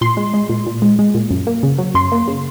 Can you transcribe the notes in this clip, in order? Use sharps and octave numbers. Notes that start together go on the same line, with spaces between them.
A#2 C6
G#3
G#3
A#2
A#2
G#3
G#3
A#2
F#2
A#3
C#3
F#3
F#2 C6
A#3
C#3